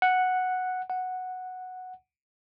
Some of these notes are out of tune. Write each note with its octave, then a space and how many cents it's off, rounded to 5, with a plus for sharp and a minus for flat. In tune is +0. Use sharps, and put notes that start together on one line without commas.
F#5 -5
F#5 -5